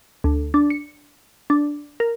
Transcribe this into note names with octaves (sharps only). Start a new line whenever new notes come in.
D2
D4
C#7
D4
A#4